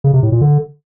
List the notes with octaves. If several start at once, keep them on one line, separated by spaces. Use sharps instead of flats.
C#3
C3
A2
A#2
D3